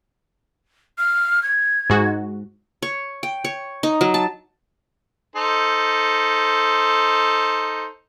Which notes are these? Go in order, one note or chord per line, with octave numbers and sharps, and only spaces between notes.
F6
G#6
G#2 G#3 F#4
C#5
G5
C#5
D#4
F#3
A5
D#4 A4 C5